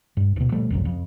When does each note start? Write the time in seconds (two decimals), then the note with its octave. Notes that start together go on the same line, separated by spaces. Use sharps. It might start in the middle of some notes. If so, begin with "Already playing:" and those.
0.17 G2
0.36 D1 B2
0.52 A#2 F3 G3 A3
0.70 G#1 C#2 F#2 C3
0.85 F2